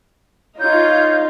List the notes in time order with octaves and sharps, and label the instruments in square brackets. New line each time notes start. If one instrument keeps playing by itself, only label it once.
[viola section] D#4 F4 [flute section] C#5 G6